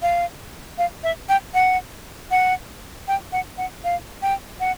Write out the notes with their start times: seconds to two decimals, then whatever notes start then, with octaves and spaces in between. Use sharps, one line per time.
0.02 F5
0.78 F5
1.03 E5
1.29 G5
1.54 F#5
2.31 F#5
3.08 G5
3.32 F#5
3.58 F#5
3.84 F5
4.22 G5
4.60 F#5